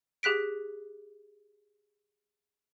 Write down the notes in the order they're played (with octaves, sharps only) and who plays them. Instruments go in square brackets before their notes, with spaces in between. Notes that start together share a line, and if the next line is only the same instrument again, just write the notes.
[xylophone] G4 G#4 F#6 B6 D7